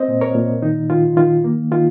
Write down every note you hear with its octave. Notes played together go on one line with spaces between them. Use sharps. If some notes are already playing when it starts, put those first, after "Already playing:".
Already playing: C4 C5 D#5
A#2
A#4 C#5
A#2
D#3 D#4
D#3 F4
D#3 F4
A#3
D#3 F4